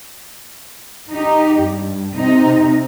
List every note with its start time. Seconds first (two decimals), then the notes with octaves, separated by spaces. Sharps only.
1.11 D#4 G4
1.59 G2
2.17 C3 D#4